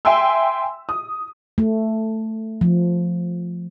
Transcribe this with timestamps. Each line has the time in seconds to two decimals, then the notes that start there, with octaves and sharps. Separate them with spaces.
0.05 E5 G5 G#5 C6 E6
0.89 D#6
1.58 A3
2.61 F3